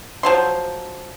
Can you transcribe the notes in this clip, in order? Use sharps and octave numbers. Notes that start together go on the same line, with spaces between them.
F3 F#3 C6